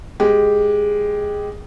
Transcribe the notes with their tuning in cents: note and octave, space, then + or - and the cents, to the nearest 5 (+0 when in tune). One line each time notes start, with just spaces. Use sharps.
G#3 +0 G4 +0